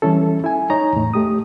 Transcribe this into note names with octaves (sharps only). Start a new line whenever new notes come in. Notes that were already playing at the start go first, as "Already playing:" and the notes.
E3 G3 C#4 E4 A4
E4 G#5
D#4 C#5 D#5 A#5
E2 A2
A3 G4 D#6